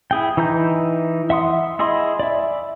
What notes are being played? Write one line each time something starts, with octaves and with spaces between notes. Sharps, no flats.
E4 G#4 G5
E3 D#4 E4 A#5 G6
E5 F#5 C6 D#6
E4 G#4 D#5 B5 C6
D5 E5